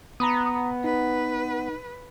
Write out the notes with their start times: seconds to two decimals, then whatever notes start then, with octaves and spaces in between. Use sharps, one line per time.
0.20 B3 A#5 B5 D#6
0.84 D#4 B4